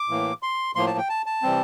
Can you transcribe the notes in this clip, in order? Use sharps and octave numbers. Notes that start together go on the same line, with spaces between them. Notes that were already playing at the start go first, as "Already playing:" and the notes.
Already playing: D6
A2 E3 A#3
C6
A2 F3 A#3 C6
A5
G5
A5
A5
C3 E3 G3 C4